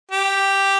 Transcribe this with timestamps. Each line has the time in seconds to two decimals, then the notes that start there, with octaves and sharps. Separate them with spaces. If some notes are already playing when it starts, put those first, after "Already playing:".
0.11 G4